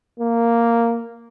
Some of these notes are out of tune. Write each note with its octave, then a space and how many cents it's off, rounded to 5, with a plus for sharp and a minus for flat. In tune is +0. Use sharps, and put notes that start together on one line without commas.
A#3 -5